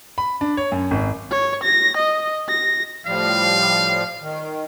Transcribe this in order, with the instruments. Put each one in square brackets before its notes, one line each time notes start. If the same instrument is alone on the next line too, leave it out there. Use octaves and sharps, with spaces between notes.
[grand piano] B5
D4
C#5
F#2
G#1
[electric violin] C#5
A#6
D#5
A#6
[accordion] A2 F3 G3 [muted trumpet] F5
[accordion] D#3